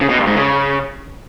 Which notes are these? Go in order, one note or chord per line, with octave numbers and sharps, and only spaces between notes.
C#3
B2
G2
G#2
C#3